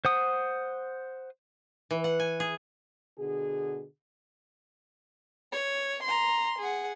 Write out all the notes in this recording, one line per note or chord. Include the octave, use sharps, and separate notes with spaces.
C5 F#5 D#6
E3
F#5
G#5
G#4
B2 D3 G#4
C#5
A#5 C6
G#4 F#5